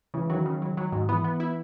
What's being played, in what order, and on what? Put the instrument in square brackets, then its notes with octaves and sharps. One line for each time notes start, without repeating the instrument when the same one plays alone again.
[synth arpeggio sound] C#3 [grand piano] E3
[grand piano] D#3 [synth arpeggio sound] F#3
[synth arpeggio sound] C#3
F#3
F#3
G#2
[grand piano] E3 [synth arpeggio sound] B3
[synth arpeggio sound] B3
E4